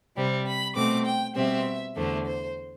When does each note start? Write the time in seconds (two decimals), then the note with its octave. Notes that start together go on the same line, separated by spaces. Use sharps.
0.16 C3 G3 C4
0.46 B5
0.75 B2 A3 C4 D6
1.05 G5
1.35 B2 G3 C4 E5
1.96 E2 D3 A3 C5
2.26 C5